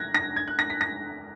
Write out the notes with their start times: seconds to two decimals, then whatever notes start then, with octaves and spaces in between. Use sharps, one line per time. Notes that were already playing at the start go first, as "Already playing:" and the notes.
Already playing: F#6 G#6 A#6
0.14 A#6
0.36 G#6
0.48 F#6
0.59 A#6
0.70 B6
0.81 A#6